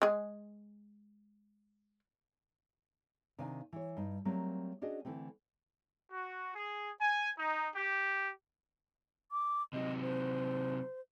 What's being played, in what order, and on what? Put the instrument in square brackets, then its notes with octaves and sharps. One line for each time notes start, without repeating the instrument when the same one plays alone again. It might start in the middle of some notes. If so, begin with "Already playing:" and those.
[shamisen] G#3 G#4
[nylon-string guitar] C3 D#3 D4 F5 G#5
E3 C#5
G2 D#4
F#3 G3 A3 A#3 C4 A#4
C#4 D4 F#4 G#4 D#5
D3 E3 A3 C4
[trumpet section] F#4
G#4
G#5
D#4
G4
[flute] D6
[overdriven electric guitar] C3 F#3 [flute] D#5
[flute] C5